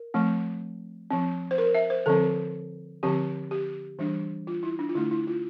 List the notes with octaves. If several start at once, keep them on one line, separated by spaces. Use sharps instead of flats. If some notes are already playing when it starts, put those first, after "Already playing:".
Already playing: A#4
F3 A3 C4
F3 C4
C5
A#4
E5
C5
D3 F3 C4 A4
D3 F3 C4 G4
G4
E3 G3 D4
F4
E4
D4
F4
D3 A3 D4 E4
E4
F4